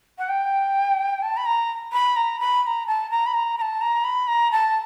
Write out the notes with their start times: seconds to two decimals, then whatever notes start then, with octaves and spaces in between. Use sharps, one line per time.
0.18 F#5
0.29 G5
1.22 A5
1.37 B5
1.46 A#5
1.93 B5
2.16 A#5
2.40 B5
2.63 B5
2.67 A#5
2.87 A5
3.10 A#5
3.26 B5
3.34 A#5
3.58 A#5
3.62 A5
3.81 A#5
4.04 B5
4.28 A#5
4.52 A5